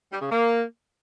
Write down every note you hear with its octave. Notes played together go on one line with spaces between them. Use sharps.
G3
C#3
A#3